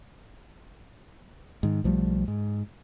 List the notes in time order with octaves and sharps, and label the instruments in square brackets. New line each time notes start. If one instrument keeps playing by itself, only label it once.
[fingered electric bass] G#2 D#3
B1 F3 G3 A3
G#2